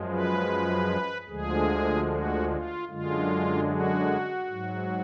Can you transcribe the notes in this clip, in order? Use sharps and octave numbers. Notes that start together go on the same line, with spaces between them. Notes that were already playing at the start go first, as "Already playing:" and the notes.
Already playing: F#2 F3 G#3
B4
D2 D3 F3 G#3 G#4
F#4
F4
F#2 D3 G#3 F4
F#4
G#2 F#3